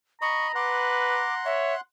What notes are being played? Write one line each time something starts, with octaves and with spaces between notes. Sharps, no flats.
D#5 A#5 B5 C#6
B4 F#5 C6 D6 F#6
C#5 E5